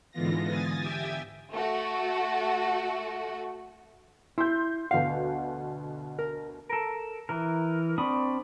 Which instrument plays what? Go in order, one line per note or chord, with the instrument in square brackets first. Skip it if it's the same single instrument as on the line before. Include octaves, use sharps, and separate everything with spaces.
[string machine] G#2 D3 E3 B3 F4 A#6
G#5 D#6 A6
G4 E5 G5 G#5 G#6
[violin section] A3 F#4
[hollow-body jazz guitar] E4 [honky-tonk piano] C6 G6
[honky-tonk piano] D2 B2 F#5 [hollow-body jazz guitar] F5
[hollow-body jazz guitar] A#4
[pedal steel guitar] A4 A#4
E3 A#4
C4 D4 B5 C#6 D#6